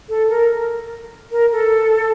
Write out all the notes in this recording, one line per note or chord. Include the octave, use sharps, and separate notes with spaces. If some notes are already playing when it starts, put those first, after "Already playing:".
A4
A#4
A#4
A4